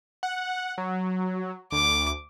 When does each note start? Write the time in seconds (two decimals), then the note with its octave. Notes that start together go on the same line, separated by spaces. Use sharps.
0.23 F#5
0.78 F#3
1.72 D2 D6